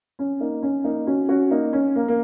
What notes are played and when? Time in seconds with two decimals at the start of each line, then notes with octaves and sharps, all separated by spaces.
0.19 C#4
0.40 A#3 D#4
0.63 C#4
0.84 A#3 D#4
1.07 C#4 F#4
1.29 C#4 F#4
1.51 A#3 D#4
1.73 C#4
1.96 A#3
2.08 A#3